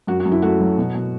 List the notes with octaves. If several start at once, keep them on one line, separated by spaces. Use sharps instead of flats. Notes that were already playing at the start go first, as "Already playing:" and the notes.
F#2 F#4
F#4
F#2
E4
A3 F#4
F#3
B2
B2